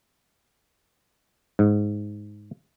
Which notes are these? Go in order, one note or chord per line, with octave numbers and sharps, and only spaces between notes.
G#2